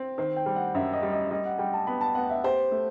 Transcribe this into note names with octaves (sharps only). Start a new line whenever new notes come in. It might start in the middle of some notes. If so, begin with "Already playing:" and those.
Already playing: C4
D#3 C5
G5
G3
F#5
F#2 E5
D#5
G3
D#5
G3 D#5
F#5
G3 G5
A5
B3 B5
A5
B3 F#5
E5
G4 C5
A3